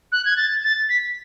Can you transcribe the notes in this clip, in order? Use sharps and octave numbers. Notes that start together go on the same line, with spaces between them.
F#6
G#6
A6
A6
B6